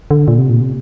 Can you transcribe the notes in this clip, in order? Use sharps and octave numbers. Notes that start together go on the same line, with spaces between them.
D3
A#2
C3
A#2
C3